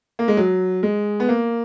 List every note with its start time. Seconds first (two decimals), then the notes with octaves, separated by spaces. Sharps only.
0.19 A#3
0.28 G#3
0.37 F#3
0.83 G#3
1.20 B3
1.29 A#3